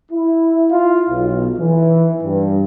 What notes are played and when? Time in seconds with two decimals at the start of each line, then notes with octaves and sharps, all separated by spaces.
0.12 E4
0.71 F4
1.09 B1
1.59 E3
2.24 G2